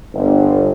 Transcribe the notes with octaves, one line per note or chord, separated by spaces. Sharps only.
G1